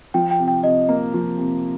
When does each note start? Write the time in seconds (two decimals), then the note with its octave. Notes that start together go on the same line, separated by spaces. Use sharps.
0.14 F3 G5
0.31 G5
0.39 C3
0.48 G5
0.64 C3 D#5
0.89 A#3
1.14 F3
1.38 C3